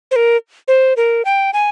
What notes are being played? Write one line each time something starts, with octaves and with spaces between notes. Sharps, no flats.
C5
A#4
C5
A#4
G5
G#5